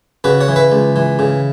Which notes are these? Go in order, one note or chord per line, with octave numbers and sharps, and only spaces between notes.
C#3 F#4 B4
C#5 F#5
E3
B4 E5
C#2
E3
C#3